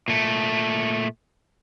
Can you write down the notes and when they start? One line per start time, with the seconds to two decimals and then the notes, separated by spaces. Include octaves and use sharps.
0.08 A#2 A3